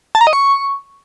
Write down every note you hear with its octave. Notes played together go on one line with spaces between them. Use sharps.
A5
A#5
D#5
C#6